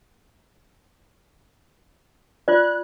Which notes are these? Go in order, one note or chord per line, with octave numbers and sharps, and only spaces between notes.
F4 D5 F#6